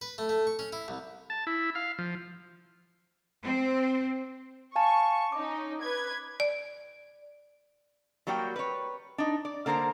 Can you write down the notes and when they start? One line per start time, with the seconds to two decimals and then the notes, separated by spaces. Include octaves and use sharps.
0.01 B4
0.18 A3
0.29 A3
0.47 C#6
0.59 C#4
0.73 E4
0.88 C2
1.30 A5
1.47 E4
1.75 F5
1.99 F3
3.43 C4
4.76 F5 G#5 A5 C#6
5.32 C#4 D#4 D6
5.82 B4 G#6
6.40 D5
8.27 F#3 G3 A#3 F#4 A#4 G5
8.56 B4 C#5
9.18 D4 D#4
9.45 D5
9.66 D3 A#3 A#4 C5 A#5